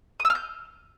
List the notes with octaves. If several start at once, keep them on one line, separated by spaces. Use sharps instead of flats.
D#6
E6
F6
G6